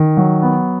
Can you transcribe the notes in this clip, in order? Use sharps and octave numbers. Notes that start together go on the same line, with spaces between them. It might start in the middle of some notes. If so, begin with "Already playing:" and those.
Already playing: D#3
F#3
B3